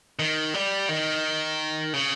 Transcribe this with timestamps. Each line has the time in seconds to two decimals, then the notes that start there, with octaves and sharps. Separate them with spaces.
0.19 D#3
0.54 G3
0.89 D#3
1.93 C#3